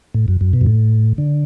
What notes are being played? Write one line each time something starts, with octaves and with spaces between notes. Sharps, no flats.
A2
F#2
F#2
B2
F#2
A2
D3